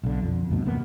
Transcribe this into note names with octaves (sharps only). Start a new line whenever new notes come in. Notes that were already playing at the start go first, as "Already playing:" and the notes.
B1 D3
F2
D2 G2 B2
E1 C3 A#3 B3